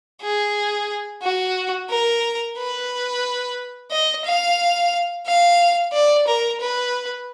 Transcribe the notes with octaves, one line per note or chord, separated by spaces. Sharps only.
G#4
F#4
A#4
B4
D#5
F5
F5
D5
A#4
B4